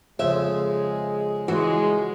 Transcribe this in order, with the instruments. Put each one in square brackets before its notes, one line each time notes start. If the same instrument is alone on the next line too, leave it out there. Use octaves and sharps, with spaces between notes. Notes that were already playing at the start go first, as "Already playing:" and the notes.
[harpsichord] F2 C#3 [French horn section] G#3 [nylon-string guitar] E5
[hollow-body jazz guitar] E3 [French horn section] G#3 [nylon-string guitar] F#4